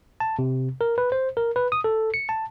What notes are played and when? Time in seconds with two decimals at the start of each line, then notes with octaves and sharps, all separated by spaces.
0.20 A5
0.39 C3
0.81 A#4
0.98 B4
1.12 C5
1.37 A#4
1.56 B4
1.72 D#6
1.84 A4
2.14 C#7
2.29 A5